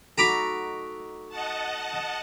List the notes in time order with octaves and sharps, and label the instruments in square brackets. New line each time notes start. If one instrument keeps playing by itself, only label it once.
[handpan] D#4 F#4 A4 [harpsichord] A#5 B5 D6
[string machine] D#5 F#5 A5